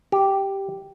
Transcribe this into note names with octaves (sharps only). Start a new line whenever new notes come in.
G4